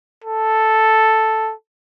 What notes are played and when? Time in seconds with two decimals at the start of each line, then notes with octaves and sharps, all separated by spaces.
0.25 A4